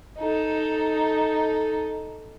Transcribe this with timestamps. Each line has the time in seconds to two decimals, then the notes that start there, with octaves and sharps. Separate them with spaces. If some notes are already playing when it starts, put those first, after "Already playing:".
0.18 D#4 A4